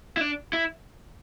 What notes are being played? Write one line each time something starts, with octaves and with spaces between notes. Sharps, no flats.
E4
D4
E4